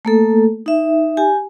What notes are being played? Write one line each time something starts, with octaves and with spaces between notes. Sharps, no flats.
A3 A#3 A4
D#4 E5
G4 G#5